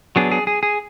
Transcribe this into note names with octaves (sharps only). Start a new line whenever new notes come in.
F#3 B3 D4 G#4
G#4
G#4
G#4